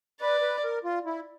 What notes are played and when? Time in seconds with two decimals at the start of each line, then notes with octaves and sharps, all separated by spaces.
0.21 B4 D5
0.42 B4
0.64 A#4
0.84 F4
1.05 E4